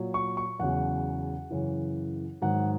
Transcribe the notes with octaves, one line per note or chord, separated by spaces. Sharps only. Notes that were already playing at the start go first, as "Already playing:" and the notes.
Already playing: A#2 F#3
C#6
C#6
E2 C#3 F#3 F#5
F#2 C#3 E3
G#2 D#3 F#3 F#5